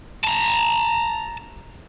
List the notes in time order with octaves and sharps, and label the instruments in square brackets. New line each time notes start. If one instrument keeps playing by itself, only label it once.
[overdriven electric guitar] A5 A#5